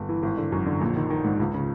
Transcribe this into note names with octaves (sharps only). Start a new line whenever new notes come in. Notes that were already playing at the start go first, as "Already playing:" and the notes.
Already playing: G1
E3
G#1
D3
F#2
D3
A#1
D#3
D#3
G#2
C#2
C#3